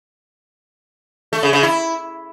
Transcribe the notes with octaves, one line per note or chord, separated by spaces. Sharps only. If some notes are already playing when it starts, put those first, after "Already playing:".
A3
C#3
C#3
E4